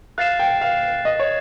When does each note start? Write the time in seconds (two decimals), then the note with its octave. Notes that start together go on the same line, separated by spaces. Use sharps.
0.18 F5 F#6 A6 C7 E7
0.39 G5
0.61 F5
1.05 D#5
1.20 C#5